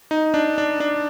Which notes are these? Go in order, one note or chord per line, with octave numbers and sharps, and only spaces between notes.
D#4
D4
D4
D4